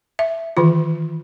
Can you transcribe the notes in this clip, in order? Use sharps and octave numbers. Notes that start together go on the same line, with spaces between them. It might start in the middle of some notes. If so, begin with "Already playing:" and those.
E5
D#3 E3 F4